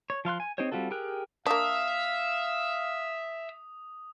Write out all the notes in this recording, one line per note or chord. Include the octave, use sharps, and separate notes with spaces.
C#5
F3 F5 C6 F#6
G#5
C4 D#4 G4 C5 C#5
G3 C4 F4 F#4 A4
G4 G#4 A#4 G5 F#6
A#3 D4 E5 F5 D#6